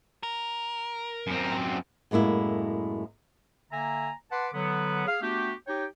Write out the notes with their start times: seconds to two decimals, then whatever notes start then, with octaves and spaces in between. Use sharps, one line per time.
0.23 A#4
1.27 F#2 C4
2.11 F#2 A2 G#3 A#3 E4
3.71 D3 A#3 E5 G#5 A#5
4.30 B4 F#5 A5 C6 D6
4.53 D3 F#3 B3
5.06 G#4 F5
5.20 A3 B3 D4 F#4 G4
5.68 D#4 G4 C#5 G5